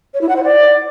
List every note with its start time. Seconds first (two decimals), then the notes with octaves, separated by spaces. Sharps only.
0.14 C#5
0.21 E4
0.29 F#5
0.36 C5
0.43 D5